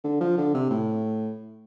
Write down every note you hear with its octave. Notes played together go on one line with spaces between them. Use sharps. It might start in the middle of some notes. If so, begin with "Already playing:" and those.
D3
F3
D3
C3
A2